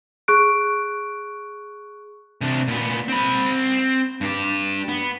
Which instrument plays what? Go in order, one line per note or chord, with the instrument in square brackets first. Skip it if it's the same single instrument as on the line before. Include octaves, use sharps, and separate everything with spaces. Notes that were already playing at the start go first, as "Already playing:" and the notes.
[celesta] G#4 C#6 F#6 D7
[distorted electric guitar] C3 D4
A#2 B3
C4 B5
G2 G4
B3